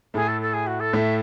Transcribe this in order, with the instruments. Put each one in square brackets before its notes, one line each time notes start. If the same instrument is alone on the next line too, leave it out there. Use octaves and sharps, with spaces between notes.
[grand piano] A2 A3 [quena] G#4
[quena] A4
A4
G#4
F#4
A4
[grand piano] A2 A3 [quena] E5